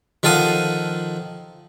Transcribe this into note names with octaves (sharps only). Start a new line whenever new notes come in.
D#3 F3 A4 F5 F#5 D#6